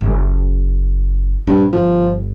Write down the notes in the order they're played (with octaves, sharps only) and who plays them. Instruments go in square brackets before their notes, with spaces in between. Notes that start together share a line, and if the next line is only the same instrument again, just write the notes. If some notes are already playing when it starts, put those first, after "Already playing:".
[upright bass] F#1
[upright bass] A#1 C4 [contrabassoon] G2
[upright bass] G1 [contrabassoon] F3